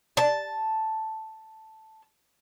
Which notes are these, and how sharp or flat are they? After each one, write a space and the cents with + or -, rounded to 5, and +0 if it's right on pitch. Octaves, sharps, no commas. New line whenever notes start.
A5 +0